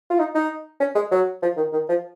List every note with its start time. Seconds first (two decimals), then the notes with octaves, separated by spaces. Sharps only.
0.10 F4
0.19 D#4
0.34 D#4
0.80 C#4
0.95 G#3
1.11 F#3
1.42 F3
1.57 D#3
1.72 D#3
1.89 F3